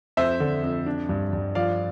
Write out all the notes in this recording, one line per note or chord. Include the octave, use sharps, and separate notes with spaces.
F2 C5 E5
D3
F2
D4
G2
G2
F3 D5 F5